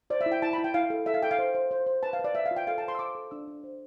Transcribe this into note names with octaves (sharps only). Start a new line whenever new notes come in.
C5 D5
E5
E4
G5
E4 A5
B5
E4
G5
E4 F5
A4
A4 E5
F5
A4 G5
F5
C5
C5
C5
C5
B4 A5
F5
B4
D5
B4 E5
F5
F4
G5
A4 F5
A5
C5
C6
E6
C5 D6
A4
D4 E6
D4
C5